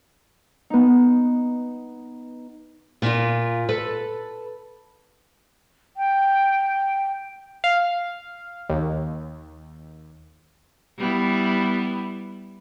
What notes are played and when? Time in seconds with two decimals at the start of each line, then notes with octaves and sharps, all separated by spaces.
0.70 B3 D#4
3.02 A#2 F4
3.69 A4 B4
5.97 G5
7.64 F5
8.69 D#2
10.98 G3 B3 E4